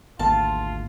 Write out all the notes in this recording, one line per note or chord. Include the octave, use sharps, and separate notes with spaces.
G#1 D2 A#3 F4 A5